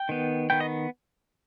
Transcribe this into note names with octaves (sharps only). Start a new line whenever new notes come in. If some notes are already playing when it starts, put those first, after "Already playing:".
Already playing: G5
D#3 B3
D#3 B3 G5
D#5